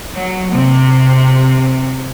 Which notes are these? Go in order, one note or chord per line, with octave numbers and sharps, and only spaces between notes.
F#3
C3